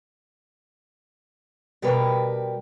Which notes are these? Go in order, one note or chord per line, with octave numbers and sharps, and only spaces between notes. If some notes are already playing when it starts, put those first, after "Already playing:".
B2 G3 G4 A#4 B4